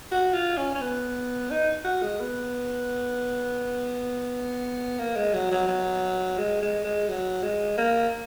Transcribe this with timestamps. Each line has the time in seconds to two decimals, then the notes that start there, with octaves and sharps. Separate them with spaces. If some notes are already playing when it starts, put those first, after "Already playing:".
0.12 F#4
0.34 F4
0.58 C#4
0.75 C#4
0.81 B3
1.51 D#4
1.85 F#4
2.02 G#3
2.20 B3
4.99 A#3
5.16 G#3
5.34 F#3
5.52 F#3
5.68 F#3
6.38 G#3
6.62 G#3
6.85 G#3
7.08 F#3
7.43 G#3
7.78 A#3